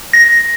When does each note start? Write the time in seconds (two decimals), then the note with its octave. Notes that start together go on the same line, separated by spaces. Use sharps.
0.13 A#6